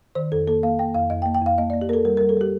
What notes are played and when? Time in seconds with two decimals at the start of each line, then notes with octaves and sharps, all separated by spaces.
0.15 D#3 C5
0.32 F2 A4
0.47 A#3 A4
0.63 A#3 F5
0.79 A#3 G5
0.94 F2 F5
1.10 F2 D#5
1.22 G5
1.26 A#3
1.35 G5
1.42 F2 F5
1.58 A#3 D#5
1.70 D5
1.74 A#3
1.81 G4
1.89 A#3 A4 A#4
2.05 G3 A#4
2.17 A#4
2.21 G3
2.29 A4
2.37 G3 G4